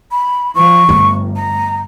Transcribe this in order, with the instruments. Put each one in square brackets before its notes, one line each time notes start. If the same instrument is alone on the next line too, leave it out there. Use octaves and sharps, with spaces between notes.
[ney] B5
[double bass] F3 [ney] C#6
[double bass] G1 [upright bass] A3
[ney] A#5